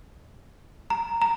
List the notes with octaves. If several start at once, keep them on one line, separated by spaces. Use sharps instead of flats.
A#5
A#5